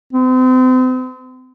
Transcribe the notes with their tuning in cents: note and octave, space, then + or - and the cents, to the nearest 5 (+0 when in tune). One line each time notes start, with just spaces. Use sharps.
C4 -40